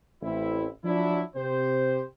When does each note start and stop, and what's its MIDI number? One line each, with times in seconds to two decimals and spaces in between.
0.22 0.67 33
0.22 0.67 60
0.22 0.67 64
0.84 1.21 53
0.84 1.21 54
0.84 1.21 62
0.84 1.21 64
1.36 2.03 48
1.36 2.03 67
1.36 2.03 72